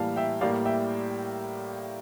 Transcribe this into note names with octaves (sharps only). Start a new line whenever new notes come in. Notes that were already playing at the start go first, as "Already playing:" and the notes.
Already playing: A2 E3 G3 A#3 F5 A5
E5 G5
A2 G3 A#3 D5 F5
E5 G5